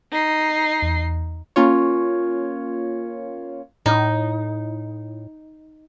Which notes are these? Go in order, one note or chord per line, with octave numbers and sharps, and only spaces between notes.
D#4 C7
E2
A#3 C#4 F4 C#5
A2 D#4